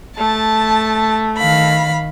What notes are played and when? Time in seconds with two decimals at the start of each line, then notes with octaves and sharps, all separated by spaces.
0.18 A3 A5
1.38 D#3 F5 B5